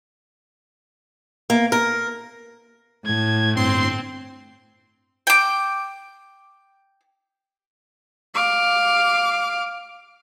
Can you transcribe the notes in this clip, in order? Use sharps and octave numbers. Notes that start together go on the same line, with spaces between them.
A#3
A#4
A2 G#6
G1 C4 C6
G5 D6
F5 D6